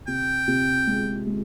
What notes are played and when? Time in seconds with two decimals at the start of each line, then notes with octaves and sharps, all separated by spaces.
0.07 C3 G5
0.48 C3
0.87 G#3
1.27 G#3